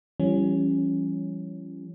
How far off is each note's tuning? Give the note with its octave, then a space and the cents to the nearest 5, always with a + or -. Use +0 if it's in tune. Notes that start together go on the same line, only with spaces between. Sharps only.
E3 +45 G3 +0 C#4 +0